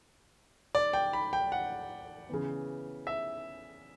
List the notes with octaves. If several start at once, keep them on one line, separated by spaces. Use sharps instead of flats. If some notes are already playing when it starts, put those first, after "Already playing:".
D5
G5
B5
G5
F#5
C#3 E3 B3
E5